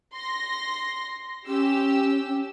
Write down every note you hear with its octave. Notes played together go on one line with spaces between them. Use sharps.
C6 A#6
C#4 G4 E6